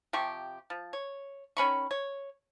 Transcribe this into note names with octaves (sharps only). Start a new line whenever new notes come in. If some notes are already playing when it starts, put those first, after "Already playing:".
C3 F3 G4 C#6
F3
C#5
D#3 C#4 B5 C#6
C#5